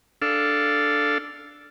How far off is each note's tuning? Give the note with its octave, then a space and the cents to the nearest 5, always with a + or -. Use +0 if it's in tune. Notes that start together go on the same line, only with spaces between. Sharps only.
D4 +0 A4 +0 F5 -5